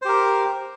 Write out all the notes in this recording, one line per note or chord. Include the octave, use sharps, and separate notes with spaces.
G4 A#4 C5